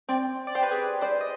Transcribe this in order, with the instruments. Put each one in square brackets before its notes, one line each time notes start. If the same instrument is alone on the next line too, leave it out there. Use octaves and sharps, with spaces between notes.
[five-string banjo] C4 [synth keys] D5
[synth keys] D5
[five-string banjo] G4 [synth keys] C5
[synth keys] B4
G#4
[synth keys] C5 [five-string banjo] D5
[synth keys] D#5